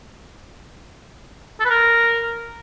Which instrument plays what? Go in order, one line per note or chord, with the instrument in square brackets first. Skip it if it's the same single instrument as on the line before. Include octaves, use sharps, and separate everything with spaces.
[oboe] A4
B4
A#4